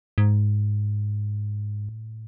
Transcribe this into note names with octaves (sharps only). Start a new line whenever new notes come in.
G#2
A2